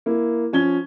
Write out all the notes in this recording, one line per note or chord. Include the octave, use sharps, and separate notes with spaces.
A#3 E4
F3 C#4 G#6 G7